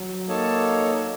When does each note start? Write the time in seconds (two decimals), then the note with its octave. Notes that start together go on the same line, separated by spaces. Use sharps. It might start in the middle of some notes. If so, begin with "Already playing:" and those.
Already playing: F#3
0.28 A#3 D#4 A4 C#5 A5